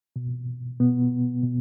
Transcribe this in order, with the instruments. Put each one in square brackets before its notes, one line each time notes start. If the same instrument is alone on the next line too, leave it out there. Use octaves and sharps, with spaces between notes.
[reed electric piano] B2
B2 B3
B2